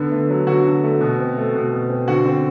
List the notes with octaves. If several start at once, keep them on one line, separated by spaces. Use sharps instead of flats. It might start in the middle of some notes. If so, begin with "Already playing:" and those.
Already playing: D3 B3
A3
F#3
D3 F#4
D3
A3
B2
C4
A3
B2
B2
C4
D3 F#4
C4